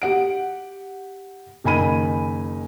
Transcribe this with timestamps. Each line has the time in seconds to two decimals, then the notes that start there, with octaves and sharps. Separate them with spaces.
0.02 G4 F#5 D7
1.64 F#1 D#3 G#5 B5 D#7